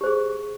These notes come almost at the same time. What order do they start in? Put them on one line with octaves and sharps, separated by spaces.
G4 C5 G#4